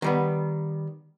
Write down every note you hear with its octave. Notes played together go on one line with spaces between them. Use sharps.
D#3 G3 B3